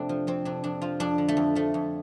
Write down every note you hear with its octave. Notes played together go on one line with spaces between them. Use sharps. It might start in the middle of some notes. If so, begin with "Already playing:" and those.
Already playing: F2 C3 A3 C4 D4
F3
F2 C4
C3 D4
F2 D4
F3 F4
F2 D4
D3
A3
F2
F3 A3
F2